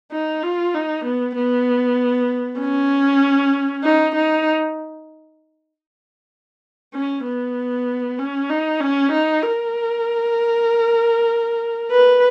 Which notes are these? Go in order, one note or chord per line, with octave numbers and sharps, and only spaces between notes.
D#4
F4
D#4
B3
B3
C#4
D#4
D#4
C#4
B3
C#4
D#4
C#4
D#4
A#4
B4